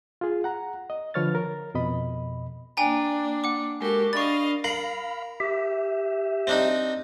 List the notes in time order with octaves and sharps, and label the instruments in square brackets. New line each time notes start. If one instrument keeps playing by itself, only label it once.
[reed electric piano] F4 G#4
F#5 A#5
D#5
D3 F3 B4 C#5 F6 A6
A#4
F2 B2 D#5 B5
[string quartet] A#3 D4 [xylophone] G5 G#5 A#5
[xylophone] F#5 D6
[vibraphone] G#3 A#4 [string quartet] F#4 G4 A4
[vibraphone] D4 D5 B5 [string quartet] D#5 F5 [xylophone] C#6 A6
[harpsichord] A#4 [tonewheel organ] F5 B5
[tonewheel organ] G4 E5
[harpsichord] C4 D4 D#4